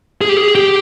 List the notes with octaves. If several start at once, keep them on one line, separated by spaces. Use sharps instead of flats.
G#4
G4
G#4
G4